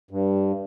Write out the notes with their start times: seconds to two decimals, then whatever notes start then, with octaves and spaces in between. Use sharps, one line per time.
0.11 G2